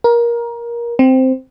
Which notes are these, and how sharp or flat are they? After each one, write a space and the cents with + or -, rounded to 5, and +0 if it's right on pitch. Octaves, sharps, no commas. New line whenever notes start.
A#4 +20
C4 -5